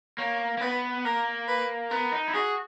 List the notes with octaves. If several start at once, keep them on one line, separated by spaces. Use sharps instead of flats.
A#3 C#5
A#3
B3 B4
A#3 A#4
B4
B3 A#4
D#4
E4
F#4 G#4